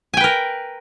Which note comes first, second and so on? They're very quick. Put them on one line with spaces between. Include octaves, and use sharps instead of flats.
G#5 G5 B4 A#4